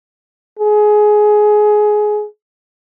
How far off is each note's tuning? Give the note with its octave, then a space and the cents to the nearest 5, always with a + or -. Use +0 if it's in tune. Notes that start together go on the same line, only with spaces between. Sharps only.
G#4 +15